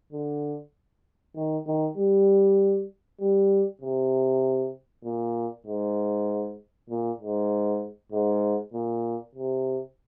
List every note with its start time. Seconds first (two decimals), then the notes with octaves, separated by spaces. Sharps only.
0.13 D3
1.36 D#3
1.67 D#3
1.97 G3
3.21 G3
3.82 C3
5.04 A#2
5.67 G#2
6.90 A#2
7.21 G#2
8.12 G#2
8.73 A#2
9.36 C3